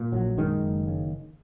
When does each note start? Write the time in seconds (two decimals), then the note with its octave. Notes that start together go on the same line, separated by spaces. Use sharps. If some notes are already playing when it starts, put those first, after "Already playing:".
Already playing: A#2
0.12 A#1 F#3
0.37 F#2 D#3 G#3
0.62 F#1
0.87 C#3